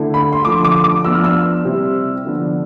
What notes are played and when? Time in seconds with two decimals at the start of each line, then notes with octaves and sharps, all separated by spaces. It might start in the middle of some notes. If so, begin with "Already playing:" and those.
Already playing: D3 A3 E4
0.14 B5
0.33 C6
0.44 D3 F3 A3 D6
0.64 D6
0.84 D6
1.04 F3 B3 D4 E6
1.14 F6
1.24 E6
1.64 C3 G3 C4 E4
2.25 D3 F3 B3 D4